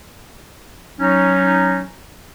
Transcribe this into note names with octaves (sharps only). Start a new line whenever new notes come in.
F#3 C#4 D#4